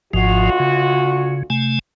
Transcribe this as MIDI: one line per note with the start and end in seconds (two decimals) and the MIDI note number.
0.13 0.50 32
0.13 1.49 38
0.13 0.50 44
0.13 0.50 53
0.13 1.49 65
0.13 1.49 66
0.60 1.43 49
1.50 1.79 48
1.50 1.79 57
1.50 1.79 80